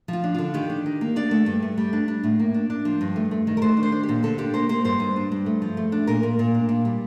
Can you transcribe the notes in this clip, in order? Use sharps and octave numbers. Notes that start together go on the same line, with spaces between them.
F3 F4
D4
D3 F4
D#3 G4
D4
D#3
A#3
D4 D5
A3
G2
A3
G3
D4
D4
A2
A#3
D4
D4
F3
G2
A3
A3
D#3
A#4
A3 C5
D4
C5
D4
G4
A#2
D3 A4
D4 G4
A#3 C5
A#3 C5
G2 C5
G2
D4
G2
A3
F3
A3
D4
A#2 A#4
A#2
A#2
D4
A#2
G3